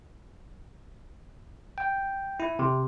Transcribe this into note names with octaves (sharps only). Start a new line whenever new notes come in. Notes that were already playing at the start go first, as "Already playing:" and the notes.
G5
E4
C3